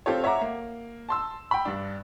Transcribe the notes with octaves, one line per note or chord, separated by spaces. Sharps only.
C4 F4 G4 A4 C#5
C#5 E5 F#5 A#5 D6
A#3
A5 C6 E6
G5 B5
G2 D4